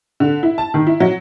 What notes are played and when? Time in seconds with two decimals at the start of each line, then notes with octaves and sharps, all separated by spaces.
0.20 D3
0.43 E4
0.58 A5
0.74 D#3
0.87 E4
1.00 F#3